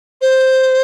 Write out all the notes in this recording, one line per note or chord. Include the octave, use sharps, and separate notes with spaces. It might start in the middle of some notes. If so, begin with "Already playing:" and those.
C5